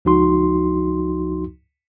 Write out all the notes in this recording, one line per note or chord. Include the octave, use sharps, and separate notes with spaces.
C#2 F3 D#4 F#4 C6